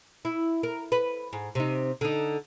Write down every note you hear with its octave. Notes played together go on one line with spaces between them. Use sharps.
E4
A#4
B4
G#2
C3 D#4
D3 D#4